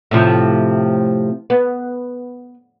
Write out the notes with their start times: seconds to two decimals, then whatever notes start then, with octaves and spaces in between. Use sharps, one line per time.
0.11 A2 C3 F3
1.50 B3